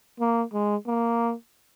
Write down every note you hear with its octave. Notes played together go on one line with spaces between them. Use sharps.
A#3
G#3
A#3